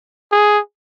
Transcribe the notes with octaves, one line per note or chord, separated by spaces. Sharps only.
G#4